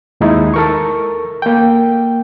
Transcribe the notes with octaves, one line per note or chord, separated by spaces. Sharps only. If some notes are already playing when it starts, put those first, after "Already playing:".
D#2 G#3 D#4 E4
A4 A#4 C#6
A#3 G5